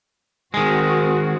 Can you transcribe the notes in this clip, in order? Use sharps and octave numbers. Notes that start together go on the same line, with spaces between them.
D#3 G#3 C4 F#4